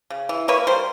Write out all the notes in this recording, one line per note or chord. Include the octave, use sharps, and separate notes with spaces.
C#3
E3
A#3 B4 C#5
G3 A#4 C5